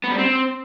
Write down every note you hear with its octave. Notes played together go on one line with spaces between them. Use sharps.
B3
G3
C4